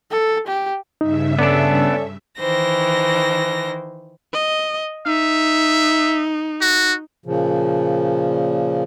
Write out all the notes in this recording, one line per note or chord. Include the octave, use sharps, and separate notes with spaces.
A4
G4
G2 C#3 D#4 E5
B3 C#4 D4 A4 D5
D#3 E3 C5 A#6
D#5
D#4 E5
F#4
A#2 C#3 F3